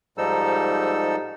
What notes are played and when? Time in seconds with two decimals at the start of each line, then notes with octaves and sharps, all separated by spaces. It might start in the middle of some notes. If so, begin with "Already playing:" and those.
0.18 G#2 F3 G3 D#4 A4 E6